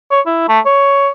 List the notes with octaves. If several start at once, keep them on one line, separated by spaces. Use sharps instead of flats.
C#5
E4
A3
C#5